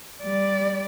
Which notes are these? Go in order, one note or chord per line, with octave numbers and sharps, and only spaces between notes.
G3 D5